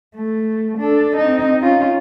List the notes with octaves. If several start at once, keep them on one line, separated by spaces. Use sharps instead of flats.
A3
D4 A4
C4 D#4
C#4 F4